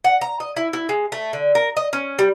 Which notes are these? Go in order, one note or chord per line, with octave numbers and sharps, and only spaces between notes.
F#5
A#5
D#5
E4
E4
G#3
A3
D3
A#4
D#5
C#4
G3